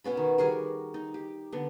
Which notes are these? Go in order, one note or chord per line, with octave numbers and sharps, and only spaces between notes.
B2 B3 C#4 B5
D#3
G3 F#4 G#4 A#4
D#4
G4
D3 B3